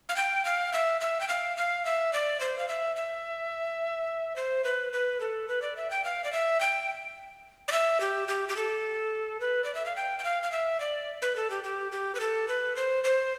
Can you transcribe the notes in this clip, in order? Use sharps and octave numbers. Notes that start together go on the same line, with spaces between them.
F5
G5
F5
E5
E5
G5
F5
F5
E5
D5
C5
F5
E5
E5
C5
B4
B4
A4
B4
D5
E5
G5
F5
D5
E5
G5
D5
E5
G4
G4
G4
A4
B4
D5
E5
F5
G5
G5
F5
F5
E5
D5
B4
A4
G4
G4
G4
B4
A4
B4
C5
C5